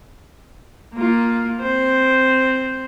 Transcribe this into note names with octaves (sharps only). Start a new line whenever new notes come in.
A#3 F4
C4 C5